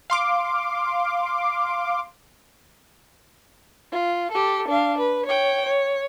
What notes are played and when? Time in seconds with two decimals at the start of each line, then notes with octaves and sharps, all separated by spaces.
0.10 F5 C6 D6
3.92 F4
4.31 G4 A4
4.68 D4 F5
4.98 B4
5.26 C#5 G5
5.65 C#5